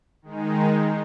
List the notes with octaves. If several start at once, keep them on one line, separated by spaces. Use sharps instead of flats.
D#3 G#3 D#4